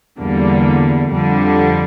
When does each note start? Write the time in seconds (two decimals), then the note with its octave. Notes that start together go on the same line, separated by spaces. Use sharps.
0.19 E2 D3 G3 A#3
1.11 F2 D3 G3